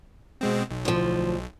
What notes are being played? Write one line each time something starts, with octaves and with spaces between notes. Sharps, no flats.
B2 G#3 C4
B1
D2 F3